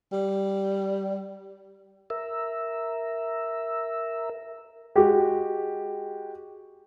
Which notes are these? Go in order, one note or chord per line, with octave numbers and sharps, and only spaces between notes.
G3
A#4 E5
G#3 F#4 G4